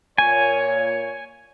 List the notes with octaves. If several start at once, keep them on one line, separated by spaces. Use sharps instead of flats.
A#2 C#5 G#5